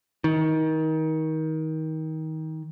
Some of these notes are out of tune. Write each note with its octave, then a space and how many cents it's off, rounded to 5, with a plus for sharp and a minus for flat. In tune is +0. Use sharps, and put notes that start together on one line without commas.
D#3 +25